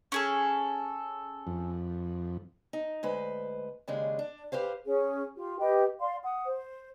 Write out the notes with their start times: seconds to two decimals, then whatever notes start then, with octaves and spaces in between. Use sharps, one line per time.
0.12 C#4 G#4 A4
1.47 F2
2.73 D#4
3.03 D2 G#3 B4 C5
3.88 D#2 C#3 G#3 D4
4.19 D4
4.52 G4 B4 C5 F5
4.84 C#4 G#4
5.36 F4 G4
5.59 G4 B4 D#5 G5
6.00 D5 F5 C6
6.24 F#5 D#6
6.47 C5